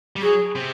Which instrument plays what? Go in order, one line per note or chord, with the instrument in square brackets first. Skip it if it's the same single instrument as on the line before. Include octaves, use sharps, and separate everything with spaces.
[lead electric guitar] G3
[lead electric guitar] F#3 [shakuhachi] G#4
[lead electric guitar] C3